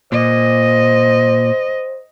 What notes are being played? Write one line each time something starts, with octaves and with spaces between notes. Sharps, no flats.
A#2 C5 D#5